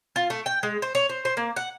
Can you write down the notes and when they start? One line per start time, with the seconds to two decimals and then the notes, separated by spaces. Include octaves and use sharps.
0.16 F4
0.30 A3
0.46 G5
0.63 G#3
0.82 C5
0.95 C#5
1.09 C5
1.25 C5
1.37 A#3
1.56 F#5